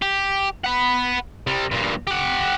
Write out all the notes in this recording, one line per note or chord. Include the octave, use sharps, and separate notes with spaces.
G4
F#5 B5
C3 G3
G2 A#2
G4 F#5